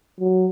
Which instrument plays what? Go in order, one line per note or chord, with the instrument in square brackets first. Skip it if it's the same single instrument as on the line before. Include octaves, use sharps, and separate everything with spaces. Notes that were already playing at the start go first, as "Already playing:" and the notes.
[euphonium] F#3